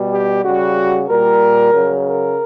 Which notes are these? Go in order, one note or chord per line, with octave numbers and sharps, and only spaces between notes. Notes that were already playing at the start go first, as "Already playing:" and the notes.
Already playing: B2 G3
G4
C#3 G3 F#4
A#2 G3 A#4
C#3 F#3
A#4